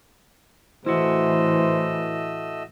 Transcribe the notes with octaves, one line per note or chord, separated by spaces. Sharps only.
A2 E3 A3 E4 F#4 C5 D#5 E6